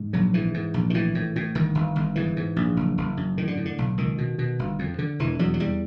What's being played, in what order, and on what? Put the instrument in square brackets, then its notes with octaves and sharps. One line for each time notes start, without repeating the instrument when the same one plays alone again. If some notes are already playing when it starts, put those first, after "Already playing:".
Already playing: [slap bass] G#2
A#1 F#3
G#2 E3
G#2
A#1
D#3
A2 E3
A2
A2
G1 D#3
G1
G1
G#2 E3
G#2
A#1
F#1
F#1
F#2
A2 D#3
D3
A2
D3
B1
C#2 D#3
B2
B2
G1
F2
D3
E1 E3
E2 F#3
F#3
E2 G3